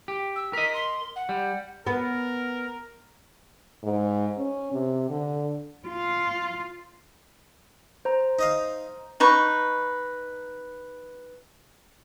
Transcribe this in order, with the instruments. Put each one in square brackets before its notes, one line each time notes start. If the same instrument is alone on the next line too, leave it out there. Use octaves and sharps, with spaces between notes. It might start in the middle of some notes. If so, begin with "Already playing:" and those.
[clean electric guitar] G4
[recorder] E6
[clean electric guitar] A#4 D#5 [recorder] B6
[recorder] C6
F#5
[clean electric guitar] G3
[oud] B3 [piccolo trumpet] A#4
[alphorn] G#2
C#4
C3
D3
[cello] F4
[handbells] C5 A#5
[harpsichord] D#4 D#5 F5
[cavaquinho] D#4 B4 C#6